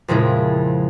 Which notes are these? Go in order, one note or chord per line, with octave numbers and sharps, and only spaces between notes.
F2 A#2 C#3 G#3 E4